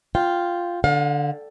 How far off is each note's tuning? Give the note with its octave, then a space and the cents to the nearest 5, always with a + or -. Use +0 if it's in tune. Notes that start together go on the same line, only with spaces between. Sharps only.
F4 +0 G5 +0
D3 +0 F5 +35